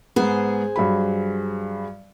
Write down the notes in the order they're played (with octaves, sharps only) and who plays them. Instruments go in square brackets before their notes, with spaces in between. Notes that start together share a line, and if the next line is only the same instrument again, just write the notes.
[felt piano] G#2 B3 [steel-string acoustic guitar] G#4 C5
[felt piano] G2 F#3 B5